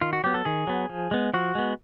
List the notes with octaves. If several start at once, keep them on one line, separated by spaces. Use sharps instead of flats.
D#3 F4
F#4
F#3 B3 G4
A4
D#3 G#4
F#3 B3
F3
G#3 B3
F3 F#4
G#3 B3